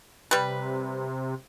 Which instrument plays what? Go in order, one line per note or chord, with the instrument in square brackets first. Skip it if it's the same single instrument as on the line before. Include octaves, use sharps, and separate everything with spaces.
[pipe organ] C3 [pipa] G3 B4